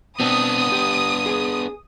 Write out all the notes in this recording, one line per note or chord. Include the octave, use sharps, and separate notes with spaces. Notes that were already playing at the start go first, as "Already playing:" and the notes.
B2 B3 C4 D4 D#6
G4
G#4